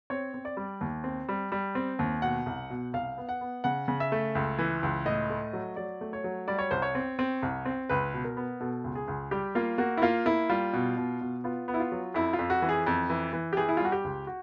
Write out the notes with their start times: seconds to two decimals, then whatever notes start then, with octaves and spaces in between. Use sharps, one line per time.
0.10 C4 C#5
0.34 C4
0.45 D5
0.57 G3
0.81 D#2
1.04 C4
1.29 G3
1.52 G3
1.75 C4
1.99 D#2
2.22 B2 F#5
2.46 C2
2.70 B2
2.93 C2 F5
3.18 B3
3.29 F#5
3.41 B3
3.64 C#3 F#5
3.88 C#3
4.00 E5
4.12 A3
4.35 C#2
4.59 E3
4.83 C#2
5.05 A2 D#5
5.30 A3
5.53 F#3
5.76 F#3 D5
6.01 A3
6.13 C#5
6.24 F#3
6.48 G3 D5
6.59 C#5
6.71 C2 C5
6.82 C#5
6.95 C4
7.19 C4
7.43 C2
7.65 C4
7.89 C#2 B4
8.13 B2
8.25 A#4
8.37 B3
8.60 B2 A4
8.84 C#2
8.95 G#4
9.08 C#2
9.31 G3 G4
9.55 A#3 F4
9.78 A#3 F#4
9.97 E4
10.02 A#3 F4
10.26 A#3 E4
10.50 G3 F4
10.73 B2
10.97 B2
11.21 B2
11.44 B3 F4
11.68 B3
11.74 E4
11.80 F4
11.92 F#3
12.14 F2 E4
12.33 F4
12.39 F2
12.50 F#4
12.62 E3
12.69 G#4
12.86 F2
13.10 E3
13.33 E3
13.53 G4
13.57 E3 G#4
13.69 E4
13.77 F4
13.80 G3 F#4
13.92 G4
14.04 C#2
14.27 F#4